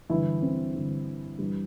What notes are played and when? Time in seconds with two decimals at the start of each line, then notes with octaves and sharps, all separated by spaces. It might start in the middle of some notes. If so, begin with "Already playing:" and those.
0.10 G2 D3 E3 E4
0.42 C4
0.75 G2 D3
1.39 G2 E3